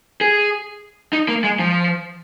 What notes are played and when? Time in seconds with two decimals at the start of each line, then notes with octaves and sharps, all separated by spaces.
0.21 G#4
1.13 D#4
1.28 A#3
1.44 G#3
1.59 F3